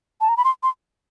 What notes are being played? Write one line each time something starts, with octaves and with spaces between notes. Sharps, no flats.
A5
A#5
B5
C6
C6